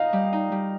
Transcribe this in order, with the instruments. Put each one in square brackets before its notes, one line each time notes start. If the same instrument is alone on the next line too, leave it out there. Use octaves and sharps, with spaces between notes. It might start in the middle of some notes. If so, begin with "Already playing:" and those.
Already playing: [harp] D#4 [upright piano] D#5 F5
[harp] G3
D#4
G3